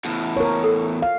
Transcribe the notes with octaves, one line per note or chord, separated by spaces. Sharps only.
E2 A2
A#4 C#5
A4
F5